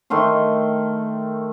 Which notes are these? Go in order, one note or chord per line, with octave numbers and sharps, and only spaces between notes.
D#3 A3 F5 C6